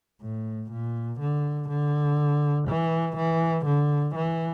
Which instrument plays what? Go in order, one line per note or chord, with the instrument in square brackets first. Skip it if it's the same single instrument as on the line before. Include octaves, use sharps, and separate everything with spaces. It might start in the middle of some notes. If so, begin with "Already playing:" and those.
[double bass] A2
A#2
D3
D3
E3
E3
D3
E3